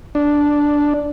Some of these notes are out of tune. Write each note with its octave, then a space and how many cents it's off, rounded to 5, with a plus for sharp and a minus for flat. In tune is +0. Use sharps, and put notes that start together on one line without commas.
D4 -5